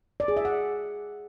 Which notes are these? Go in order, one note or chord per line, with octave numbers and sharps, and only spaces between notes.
D5
G#4
E5
F#5